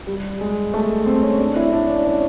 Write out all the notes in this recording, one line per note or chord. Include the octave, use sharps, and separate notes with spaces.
G3
G#3
A3
C4
C#4
D4
E4
D4
C#4
C#4